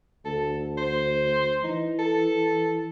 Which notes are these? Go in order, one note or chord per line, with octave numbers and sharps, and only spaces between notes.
D2 A4
C5
E3 D#4
A4